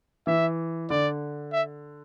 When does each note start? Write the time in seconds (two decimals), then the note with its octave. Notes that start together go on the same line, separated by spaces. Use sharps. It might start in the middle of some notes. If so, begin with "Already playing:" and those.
0.27 E3 E5
0.90 D3 D5
1.52 E5